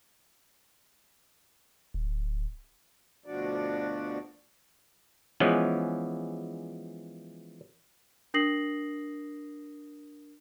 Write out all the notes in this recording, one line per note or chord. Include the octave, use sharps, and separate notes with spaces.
D1
D2 B2 F3 D4 F#4 D5
E3 F3 G#3 B3 C#4
D4 A#4 D#6 A#6 C7 F#7